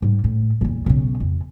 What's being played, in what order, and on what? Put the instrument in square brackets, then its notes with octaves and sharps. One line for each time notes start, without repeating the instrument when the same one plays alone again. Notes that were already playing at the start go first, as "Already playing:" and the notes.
[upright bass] G#2 G3
A2
D#1 E2
B1 C#3
F2